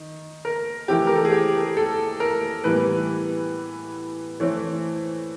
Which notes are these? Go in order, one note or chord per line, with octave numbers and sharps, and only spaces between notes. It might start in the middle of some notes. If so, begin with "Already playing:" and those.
Already playing: D#3
A#4
E3 A3 C4 G4
A#4
A4
G#4
G4
A4
A#4
A2 E3 G3 B3 B4
E3 A3 C4 C#5